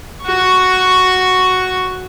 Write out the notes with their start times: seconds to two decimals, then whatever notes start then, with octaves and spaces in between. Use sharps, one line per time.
0.24 F#4 C#6